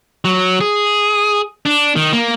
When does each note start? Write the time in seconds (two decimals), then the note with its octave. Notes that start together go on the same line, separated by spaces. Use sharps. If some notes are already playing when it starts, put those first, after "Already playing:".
0.25 F#3
0.61 G#4
1.66 D4
1.96 D#3
2.13 A#3